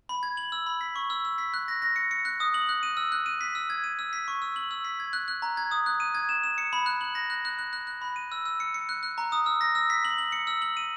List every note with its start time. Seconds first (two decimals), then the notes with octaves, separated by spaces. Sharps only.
0.09 B5
0.23 G#6
0.37 F#7
0.52 E6
0.66 B5
0.81 B6
0.96 C#6
1.10 E6
1.25 E6
1.38 B6
1.54 F#6
1.68 A#6
1.82 A#6
1.96 C#7
2.11 C#7
2.25 F#6
2.40 D#6
2.54 F#7
2.69 F#6
2.83 D#7
2.97 E6
3.12 F#6
3.26 D#7
3.41 B6
3.55 E6
3.70 G#6
3.84 D#7
3.99 E6
4.13 B6
4.28 C#6
4.42 E6
4.56 F#7
4.71 E6
4.84 B6
5.00 G#6
5.13 F#6
5.28 F#6
5.42 A#5
5.57 G#6
5.71 D#6
5.86 F#6
6.00 D#7
6.15 G#6
6.29 E7
6.44 E7
6.58 C#7
6.73 B5
6.86 F#6
7.01 F#7
7.15 A#6
7.30 F#6
7.45 F#6
7.59 F#6
7.73 F#6
7.87 F#6
8.02 B5
8.16 D#7
8.32 E6
8.45 E6
8.60 C#7
8.74 C#7
8.89 F#6
9.03 F#6
9.18 A#5
9.32 D#6
9.46 E6
9.61 A#6
9.75 E6
9.90 B6
10.05 F#7
10.18 F#7
10.32 C#7
10.47 E6
10.62 F#7
10.77 D#7